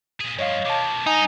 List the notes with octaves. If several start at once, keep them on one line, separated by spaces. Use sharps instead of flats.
A#2 G#4
G2 F3 C#5 D#5 F5
B2 D#3 A5 D6
G2 D#4 G#5 A#5